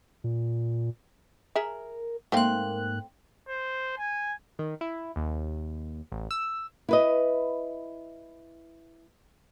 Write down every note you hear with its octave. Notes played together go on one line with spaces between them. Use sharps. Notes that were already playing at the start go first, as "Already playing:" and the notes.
A#2
G#4 A#4 E5
G#2 A3 A#3 C4 F5 F#6
C5
G#5
D#3
E4
D#2
A1
E6
E4 B4 D#5